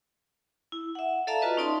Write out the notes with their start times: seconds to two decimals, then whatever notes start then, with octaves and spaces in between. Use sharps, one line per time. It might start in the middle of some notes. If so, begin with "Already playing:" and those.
0.72 E4
0.95 E5 F#5
1.27 A4 D5 E5 F5 A5 A#5
1.42 F4 F#4 B4 D#5
1.57 C#4 D#4 D5 A5 C6